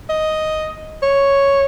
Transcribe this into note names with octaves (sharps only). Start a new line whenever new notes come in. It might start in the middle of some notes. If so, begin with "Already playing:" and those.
D#5
C#5